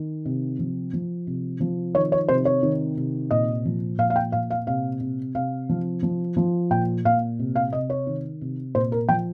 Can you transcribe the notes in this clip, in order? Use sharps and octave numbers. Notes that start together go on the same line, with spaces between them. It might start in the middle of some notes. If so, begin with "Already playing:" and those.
Already playing: D#3
C3
F3
F3
C3
F3
D#3 C#5
C#5
C3 C5
C#5
D#3
C3
A#2 D#5
F3
A#2 F5
F5
G5
A#2 F5
F5
C3 F5
C3
C3 F5
F3
F3
F3
A#2 G5
A#2 F5
C3
F5
C3 D#5
C#5
D#3
C3
A#2 C5
A#4
F3 G5